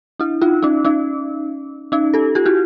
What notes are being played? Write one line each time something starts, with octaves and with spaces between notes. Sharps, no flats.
D4 E4
D#4 F4
C#4 D#4
C#4 D#4
C#4 D#4
G4 A4
F4 G4
E4 F#4